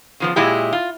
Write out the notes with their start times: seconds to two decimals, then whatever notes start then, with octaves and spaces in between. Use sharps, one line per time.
0.20 C#3 F3 B3
0.36 A#2 G#3 E4 G4
0.73 F4